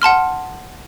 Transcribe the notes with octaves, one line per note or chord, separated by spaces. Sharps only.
F#5 A5 C6 F6